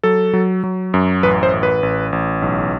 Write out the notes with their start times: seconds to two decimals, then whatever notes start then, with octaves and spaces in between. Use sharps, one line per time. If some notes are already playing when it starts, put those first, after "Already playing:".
0.03 F#3 A4
0.33 F#3
0.64 F#3
0.94 F#2
1.23 A1 B4
1.43 C5
1.53 A1
1.63 B4
1.83 A1
2.12 A1
2.42 B1